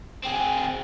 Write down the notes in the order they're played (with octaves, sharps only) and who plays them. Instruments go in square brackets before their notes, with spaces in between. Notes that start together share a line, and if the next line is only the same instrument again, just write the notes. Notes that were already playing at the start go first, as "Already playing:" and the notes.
[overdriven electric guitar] C4 G#4